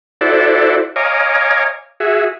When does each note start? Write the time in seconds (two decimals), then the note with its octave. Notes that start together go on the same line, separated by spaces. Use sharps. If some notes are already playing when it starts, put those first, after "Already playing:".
0.21 E4 F#4 A4 C5 D5
0.96 C#5 D#5 F5 G#5 A#5 D6
2.00 F#4 G#4 E5